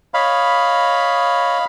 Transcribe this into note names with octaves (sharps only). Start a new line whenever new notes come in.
C#5 D#5 F5 B5